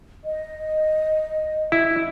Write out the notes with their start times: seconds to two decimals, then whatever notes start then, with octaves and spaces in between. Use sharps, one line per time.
0.24 D#5
1.72 E4